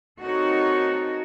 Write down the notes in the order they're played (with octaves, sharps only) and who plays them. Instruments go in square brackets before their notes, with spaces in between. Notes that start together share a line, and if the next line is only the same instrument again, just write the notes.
[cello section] C4 D#4 F#4 A4 A#4 C#5